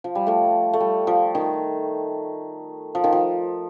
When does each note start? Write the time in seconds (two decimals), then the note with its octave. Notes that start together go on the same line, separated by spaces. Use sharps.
0.04 F3
0.15 G3
0.27 F3 A3
0.73 A3
0.80 G3
1.07 F3
1.35 D#3
2.95 F3
3.04 D#3
3.12 F3